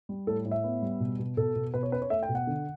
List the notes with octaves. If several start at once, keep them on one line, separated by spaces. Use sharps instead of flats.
G3
A2 A4
A2
E5
B3
G3
B2
B2
B2 A4
B2
B2 B4
C#5
C#4 B4
C#5
A3 E5
G5
B2
F#5
D3